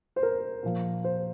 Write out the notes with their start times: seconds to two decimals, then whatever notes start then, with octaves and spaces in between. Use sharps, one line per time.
0.16 C5
0.23 A#4
0.63 A#2 F3
1.04 C5